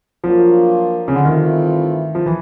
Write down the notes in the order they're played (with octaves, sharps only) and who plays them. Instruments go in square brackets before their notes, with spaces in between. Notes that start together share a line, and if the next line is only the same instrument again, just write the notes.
[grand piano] F3 [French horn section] F#3 A#3 D4 F4
[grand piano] C#3
D3
[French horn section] G2 E3 A3 C4 F4 [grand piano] D#3
[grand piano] F3
E3